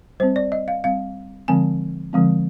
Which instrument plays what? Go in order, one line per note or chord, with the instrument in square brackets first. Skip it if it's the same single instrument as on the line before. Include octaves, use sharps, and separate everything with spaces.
[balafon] G3 C5
C4
D5
D#5
F5
G3 C4 F5
D3 F3 G#3 C4 G#5
D3 F3 G#3 C4